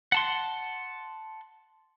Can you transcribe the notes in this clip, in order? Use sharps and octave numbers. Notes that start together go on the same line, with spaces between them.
F#5 A5 C6